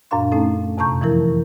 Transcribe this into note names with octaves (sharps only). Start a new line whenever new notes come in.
F#2 A#2 D4 F5 C6
A3 C#4 D#4 A4
F2 C3 A5 A#5 C#6 G6
E3 F3 E4 A#4